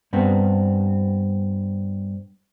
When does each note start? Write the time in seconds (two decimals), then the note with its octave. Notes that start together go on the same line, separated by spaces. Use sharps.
0.13 G2 B3 C4